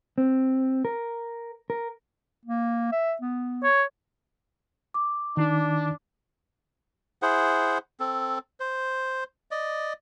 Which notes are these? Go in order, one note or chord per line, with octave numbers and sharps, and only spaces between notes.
C4
A#4
A#4
A#3
E5
B3
C#5
D6
D#3 D4 D#4
E4 G#4 C5 F#5
C4 A4
C5
D5 D#5